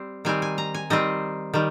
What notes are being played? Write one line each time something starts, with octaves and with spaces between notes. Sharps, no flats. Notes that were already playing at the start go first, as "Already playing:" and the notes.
Already playing: G3 C4
D#3 G3 C4 G#5
G#5
A#5
G#5
D#3 G3 C4 D#5
D#3 G3